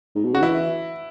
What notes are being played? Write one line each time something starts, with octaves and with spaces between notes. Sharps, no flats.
G#2
B2
C#3 F#4
E3 E4